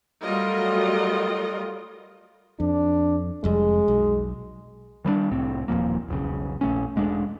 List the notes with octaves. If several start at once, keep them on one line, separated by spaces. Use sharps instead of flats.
F#3 G3 A3 F4 A#4 D#5
F2 D4
F1 F2 G3 G#3
B1
D#3 G3 G#3 D4
C2 A2 C4
D#1 A#2 F3 A#3
E1 B1 C#3
A#1 A3 C#4
E1 G#3 A3 D4